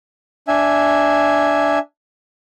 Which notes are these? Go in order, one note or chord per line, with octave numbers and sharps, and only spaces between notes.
D4 E5 G#5